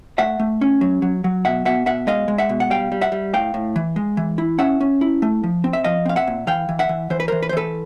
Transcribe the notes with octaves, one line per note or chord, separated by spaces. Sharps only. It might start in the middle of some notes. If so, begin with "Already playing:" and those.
A3 E5 F#5
A3
C#4
F#3
F#3
F#3
B2 E5 F#5
B2 E5 F#5
B2 E5 F#5
G#3 D#5 F5
G#3
E5 F#5
B2
F#5
G3 F5 G5
G3
E5 F#5
G3
A2 F5 G5
A2
E3
G#3
E3
E4
C#4 E5 F#5
C#4
E4
A3
F3
C4
E5
F3 D#5 F5
C4 F5
E5 F#5
A#2
E3 F5 G5
E3
E5 F#5
E3
E3 C5
B4
E3 A#4 C5
B4
C5
E3 A4 B4